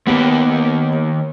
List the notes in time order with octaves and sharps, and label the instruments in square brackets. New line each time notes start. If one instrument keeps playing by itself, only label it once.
[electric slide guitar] D#3 A#3 G4 [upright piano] B3